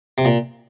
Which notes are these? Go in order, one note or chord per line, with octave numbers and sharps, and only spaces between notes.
C3
A#2